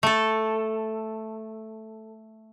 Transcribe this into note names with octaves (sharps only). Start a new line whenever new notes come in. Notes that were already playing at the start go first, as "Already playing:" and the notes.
A3 A4